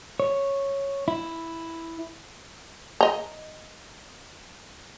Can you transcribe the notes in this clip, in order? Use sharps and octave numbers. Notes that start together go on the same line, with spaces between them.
C#5
E4
D#5 A#5